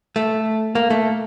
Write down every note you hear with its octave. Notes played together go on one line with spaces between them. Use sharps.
A3
A#3
A3